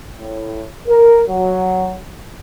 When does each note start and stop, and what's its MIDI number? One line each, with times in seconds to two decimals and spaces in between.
0.17 0.63 45
0.87 1.21 70
1.27 1.95 54